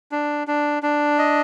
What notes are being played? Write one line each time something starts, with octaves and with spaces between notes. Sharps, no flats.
D4
D4
D4
D#5